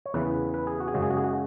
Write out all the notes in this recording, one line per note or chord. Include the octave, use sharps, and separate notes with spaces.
C#5
E2 C#3 E3 B4
B4
G#4
F#4
G#4
F#2 C#3 G#3 F#4
G#4
F#4
G#4
F#4